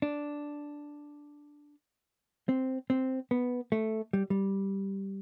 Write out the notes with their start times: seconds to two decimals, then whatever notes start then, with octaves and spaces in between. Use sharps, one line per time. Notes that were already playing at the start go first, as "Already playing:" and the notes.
0.02 D4
2.49 C4
2.90 C4
3.31 B3
3.72 A3
4.13 G3
4.30 G3